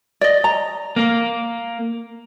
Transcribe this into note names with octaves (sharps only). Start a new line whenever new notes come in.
D5 D#5
A#5
A#3